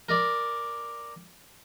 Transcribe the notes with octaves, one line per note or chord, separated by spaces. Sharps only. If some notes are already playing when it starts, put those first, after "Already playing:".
A#4 D5